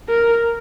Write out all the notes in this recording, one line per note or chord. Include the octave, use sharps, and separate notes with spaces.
A#4